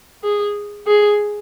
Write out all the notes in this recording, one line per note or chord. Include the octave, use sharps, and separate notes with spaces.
G#4
G#4